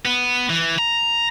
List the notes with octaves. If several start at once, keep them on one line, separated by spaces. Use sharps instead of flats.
B3
E3
A#5